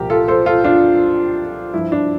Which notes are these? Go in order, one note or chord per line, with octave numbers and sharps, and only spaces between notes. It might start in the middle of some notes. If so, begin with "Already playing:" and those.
Already playing: C2 A#2 F3 G4 A#4
F4 A4
A4 C5
F4 A4
D4 F4
G2 F3 E4
D4